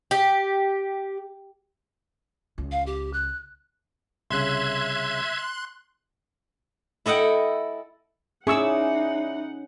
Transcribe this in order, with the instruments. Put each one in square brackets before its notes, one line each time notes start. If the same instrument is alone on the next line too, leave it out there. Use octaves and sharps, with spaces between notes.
[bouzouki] G4
[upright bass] C#2
[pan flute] F5
G4
F#6
[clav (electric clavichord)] C2 C#3 [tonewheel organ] E5 G#6 [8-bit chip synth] C6 F#6
[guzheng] E4 A4 D#5 F#5 G5
[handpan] C#4 [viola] D#4 F#5 [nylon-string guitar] E4 D5 [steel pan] G#4 C#6 E6